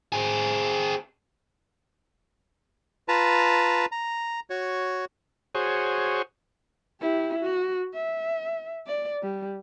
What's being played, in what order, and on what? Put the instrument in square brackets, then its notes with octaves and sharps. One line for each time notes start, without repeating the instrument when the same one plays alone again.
[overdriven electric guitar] C4 G#4
[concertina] F4 B4 A5 A#5
A#5
F#4 C#5
[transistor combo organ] F#4 G#4 C5 C#5
[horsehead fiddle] E4 G4
F#4
E5
D5
G3